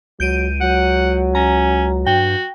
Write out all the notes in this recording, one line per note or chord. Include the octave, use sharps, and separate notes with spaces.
C#2 F#3 G6 D7 D#7
F#3 F#5
C#4 A#5
G2 F#4 G5